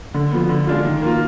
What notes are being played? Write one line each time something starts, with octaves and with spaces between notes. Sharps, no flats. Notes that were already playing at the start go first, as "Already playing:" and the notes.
D3
F3 B3
D3
G#3 D4 F4
D#3
A#3 F4